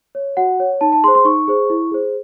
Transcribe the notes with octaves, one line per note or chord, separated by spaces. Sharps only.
C#5
F#4 F#5
C#5
D#4 A5
A5
G#4 C5 C6
C6
D#4 C#6
G#4 C5
E4
G#4 C5